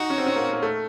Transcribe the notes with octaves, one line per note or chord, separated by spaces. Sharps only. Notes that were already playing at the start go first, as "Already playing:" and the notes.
Already playing: D#4 F#4
C#4
C4
C#4
A#3
A#3
A3